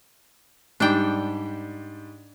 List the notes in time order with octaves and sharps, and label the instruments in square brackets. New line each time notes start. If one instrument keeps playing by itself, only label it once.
[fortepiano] G#2 G3 [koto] D4 G5